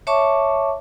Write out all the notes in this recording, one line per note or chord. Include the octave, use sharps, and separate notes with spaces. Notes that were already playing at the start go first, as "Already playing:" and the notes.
C#5 E5 A5 C#6 D6